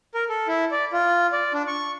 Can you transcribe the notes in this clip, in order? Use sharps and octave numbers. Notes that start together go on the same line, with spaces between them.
A#4
A4
E4
D5
F4
D5
D4
C#6